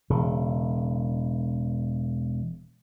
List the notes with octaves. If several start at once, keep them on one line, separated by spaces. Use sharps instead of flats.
E1 C#3